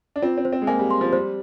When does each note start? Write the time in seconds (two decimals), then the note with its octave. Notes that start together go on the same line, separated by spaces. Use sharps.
0.16 D4
0.22 C4 F4
0.38 C4
0.45 C5
0.53 C4
0.62 G#3
0.67 A#3 G#5
0.79 G3
0.91 C6
1.01 F3
1.13 G3 C5